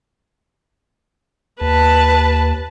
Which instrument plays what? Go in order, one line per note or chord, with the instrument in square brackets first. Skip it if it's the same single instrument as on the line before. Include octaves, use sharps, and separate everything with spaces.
[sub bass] D#2 [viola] B4 A5